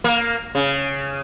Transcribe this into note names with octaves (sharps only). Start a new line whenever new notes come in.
A#3
C#3